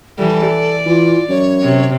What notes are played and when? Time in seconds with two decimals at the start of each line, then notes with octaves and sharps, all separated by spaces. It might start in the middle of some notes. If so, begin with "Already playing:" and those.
0.18 E3 G3 A4
0.47 D5
0.86 E3 F4
1.29 F#2 C#5
1.62 C3